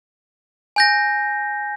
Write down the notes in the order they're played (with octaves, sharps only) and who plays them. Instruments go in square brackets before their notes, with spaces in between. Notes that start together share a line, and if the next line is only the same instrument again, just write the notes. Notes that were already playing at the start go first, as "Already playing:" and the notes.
[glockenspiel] G#5 G6 A#6